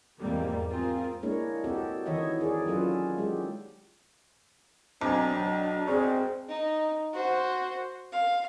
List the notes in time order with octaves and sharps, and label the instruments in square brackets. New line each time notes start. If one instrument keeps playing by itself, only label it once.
[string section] E2 G#2 F3 G3 A#3 C4
C4 F4 G#4 A#4
[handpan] G#3 A#3 D4 E4 A#4 C#5
C4 F#4 G4 A4
D#3 E3 E4 C#5 D#5 E5
E4 G#4 A#4 D5
F#3 C#4 F4 A4 B4
G#3 G4
[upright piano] B1 [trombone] C4 [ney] D4 [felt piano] G#5 A#5 D6
[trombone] F#3 [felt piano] G5
[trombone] C4 [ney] G#4 [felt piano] D5 C#6 F6
[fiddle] D#4
F#4 C5
F5